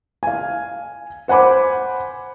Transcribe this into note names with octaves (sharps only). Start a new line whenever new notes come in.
F5 G#5
C5 F#5 G#5 B5 D6